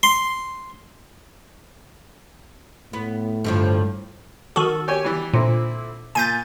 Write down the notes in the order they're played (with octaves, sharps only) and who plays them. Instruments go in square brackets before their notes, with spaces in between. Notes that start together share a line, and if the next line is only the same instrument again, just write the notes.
[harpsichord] C6
[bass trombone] A2 [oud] B3
[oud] G2 D3 F3
[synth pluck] D#3 F#4 [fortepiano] A4
[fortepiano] G4 C#5 G#5
E3 G3
[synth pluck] A#2 [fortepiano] D3 C4 E4
[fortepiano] A#2 [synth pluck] G#5 G6 A6